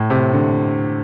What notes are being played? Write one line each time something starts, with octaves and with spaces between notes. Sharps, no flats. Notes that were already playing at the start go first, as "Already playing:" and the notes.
Already playing: A2
C3
D3